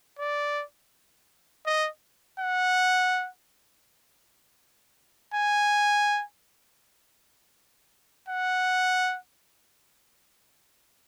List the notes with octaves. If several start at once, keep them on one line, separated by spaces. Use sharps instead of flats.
D5
D#5
F#5
G#5
F#5